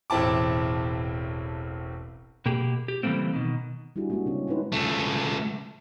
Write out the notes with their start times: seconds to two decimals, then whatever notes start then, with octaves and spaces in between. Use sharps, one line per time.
0.10 E1 A1 C4 E4 A5 D6
2.46 B2 A#3 G4 G#4
2.88 G4
3.03 C#3 E3 G3 A3 A#3 C4
3.33 B2 D#3
3.96 G3 D4 E4 F#4 G#4
4.10 G#3 A#3 C#4 D4 F#4
4.26 C#3 G#3 C4 C#4
4.47 C#4 D#4 E4 B4 C5
4.72 C#2 A3